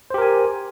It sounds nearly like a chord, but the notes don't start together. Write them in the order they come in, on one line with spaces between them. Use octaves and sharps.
C5 G4 A#4 G#5